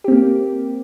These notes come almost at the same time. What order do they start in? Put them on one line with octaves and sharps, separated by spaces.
G4 C4 A#3